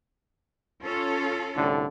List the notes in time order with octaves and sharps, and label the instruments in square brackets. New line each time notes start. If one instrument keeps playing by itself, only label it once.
[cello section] C#4 F4 A4
[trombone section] C2 A2 D3